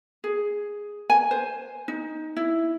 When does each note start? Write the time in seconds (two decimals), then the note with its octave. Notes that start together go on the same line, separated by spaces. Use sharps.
0.24 G#4
1.10 G#5
1.31 C5
1.88 D#4
2.37 E4